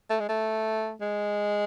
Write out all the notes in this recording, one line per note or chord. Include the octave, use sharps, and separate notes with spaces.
A3
G#3
A3
G#3